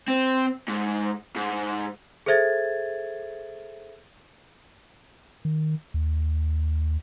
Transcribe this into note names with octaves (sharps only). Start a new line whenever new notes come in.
C4
G#2
G#2
G#4 A4 C5 E5 G#6 A6
D#3
D#2